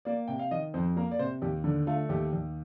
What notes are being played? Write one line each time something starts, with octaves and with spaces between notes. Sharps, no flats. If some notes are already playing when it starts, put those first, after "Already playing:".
A#3 D5
C3 G5
F5
D#3 D#5
F2 C5
A#3 A#4
D5
C3 C5
D#2 G4
D3
A3 F4
D#2 G4
D#2